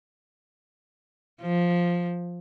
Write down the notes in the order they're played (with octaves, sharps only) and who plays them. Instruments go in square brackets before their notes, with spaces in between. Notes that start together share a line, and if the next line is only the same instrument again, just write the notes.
[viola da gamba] F3